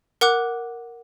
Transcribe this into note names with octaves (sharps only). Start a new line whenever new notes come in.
A#4 F#5 D6 F#6